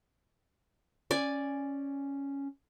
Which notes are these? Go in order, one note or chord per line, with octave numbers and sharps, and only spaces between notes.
C#4 D5 G#5